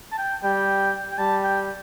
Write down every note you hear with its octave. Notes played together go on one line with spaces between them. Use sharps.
A5
G5
G3 G5
G5
G3 A5
G5